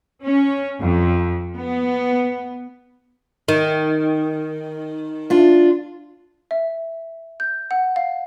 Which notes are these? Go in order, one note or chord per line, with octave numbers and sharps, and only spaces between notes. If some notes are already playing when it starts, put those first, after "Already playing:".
C#4
F2
B3
D#3
D4 F4
E5
G6
F#5
F5